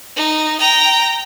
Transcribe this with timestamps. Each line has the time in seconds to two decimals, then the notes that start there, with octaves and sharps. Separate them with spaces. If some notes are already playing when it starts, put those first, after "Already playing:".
0.16 D#4
0.60 G5 A#5